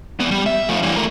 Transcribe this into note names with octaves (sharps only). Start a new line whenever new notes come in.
E2 B3
G3
E5
F3 A3
G2 E3
A3 A#4